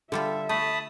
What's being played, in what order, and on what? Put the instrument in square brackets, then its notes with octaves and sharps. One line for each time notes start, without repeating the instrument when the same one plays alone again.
[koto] D3 G3 F4 [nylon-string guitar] A4 [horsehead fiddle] E5
[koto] A3 [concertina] A5 B5 D#6